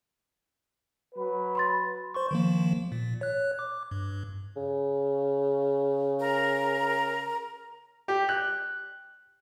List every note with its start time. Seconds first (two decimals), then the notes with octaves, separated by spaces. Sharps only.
1.14 F#3 B4
1.55 B5 C6 A6
2.14 C5 C6 C#6
2.31 D#3 F3 A#3
2.92 A#2
3.21 C#5 F#6
3.59 D6
3.91 G2
4.56 C#3
6.20 A#4 A#5
8.08 G4
8.29 F#6